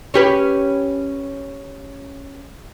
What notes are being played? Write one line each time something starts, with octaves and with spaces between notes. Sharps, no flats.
C#4 G4 B4